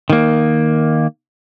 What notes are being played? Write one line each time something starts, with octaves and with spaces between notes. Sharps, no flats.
D#3 A#3